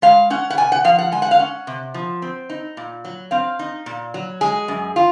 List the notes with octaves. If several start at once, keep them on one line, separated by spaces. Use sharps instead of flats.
G#3 F5
C#4 F#5
F#5
C3 G#5
F#5
F3 F5
F#5
G#3 G#5
F#5
F5
C#4 F#5
C3
F3
C4
D#4
A#2
F#3
C4 F5
D#4
A#2
F#3
G#3 G#4
F#2
F4